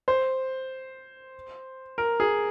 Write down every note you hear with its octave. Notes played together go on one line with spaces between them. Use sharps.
C5
A#4
G#4